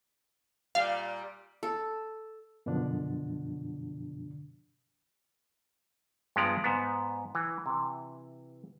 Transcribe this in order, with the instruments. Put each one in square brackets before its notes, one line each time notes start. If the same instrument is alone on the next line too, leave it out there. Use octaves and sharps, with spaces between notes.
[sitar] A#2 G3 [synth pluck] F5
[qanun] A4
[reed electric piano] F#2 B2 D3 F3 D4
[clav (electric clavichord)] G2 F3 G#3 B3 D5 A#5
G#2 B3
E3
C3 E3